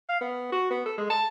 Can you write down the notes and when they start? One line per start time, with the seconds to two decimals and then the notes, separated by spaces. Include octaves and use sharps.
0.09 F5
0.21 B3
0.52 F#4
0.70 B3
0.86 A4
0.98 G#3
1.10 A5